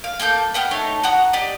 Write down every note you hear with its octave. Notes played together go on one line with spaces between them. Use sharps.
F5
A#3 A4 C#6 G6
B3 F#5 G5 F6
A3 D#4 C#5 A5
F#4 F#5 A#5 D#6
G4 D5 D#5